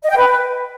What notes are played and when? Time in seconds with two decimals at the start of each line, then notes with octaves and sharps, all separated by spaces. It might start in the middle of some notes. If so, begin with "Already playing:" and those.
0.03 D#5
0.10 G5
0.18 B4